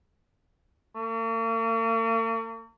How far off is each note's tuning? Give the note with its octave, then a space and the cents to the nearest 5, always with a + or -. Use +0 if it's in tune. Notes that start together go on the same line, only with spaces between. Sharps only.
A#3 -45